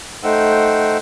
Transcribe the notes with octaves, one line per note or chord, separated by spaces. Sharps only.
A3 D#4 C5 F#5 G5 E6